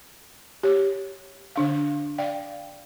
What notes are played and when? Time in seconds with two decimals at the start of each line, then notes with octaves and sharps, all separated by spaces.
0.63 G4 C#5
1.56 D3 D4 F5
2.18 D5 F5 G5